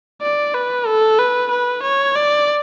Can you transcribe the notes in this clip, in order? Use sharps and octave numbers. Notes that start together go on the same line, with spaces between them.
D5
B4
A4
B4
B4
C#5
D5